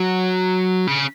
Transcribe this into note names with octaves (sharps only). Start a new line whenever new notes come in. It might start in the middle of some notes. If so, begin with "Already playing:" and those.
Already playing: F#3
C#3